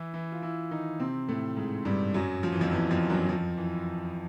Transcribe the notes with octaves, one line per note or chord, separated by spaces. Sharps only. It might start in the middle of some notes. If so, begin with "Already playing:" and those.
Already playing: E3 E4
E3 E4
F4
E3 E4
D#3 D#4
C3 C4
A2 A3
G#2 G#3
G2 G3
F#2 F#3
F3
E3
F2 F3
E2 E3
F2 F3
F#2 F#3
F2 F3
E3